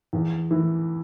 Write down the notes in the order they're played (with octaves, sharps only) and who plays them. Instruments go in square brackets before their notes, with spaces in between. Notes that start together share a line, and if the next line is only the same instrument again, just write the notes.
[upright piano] E2
E3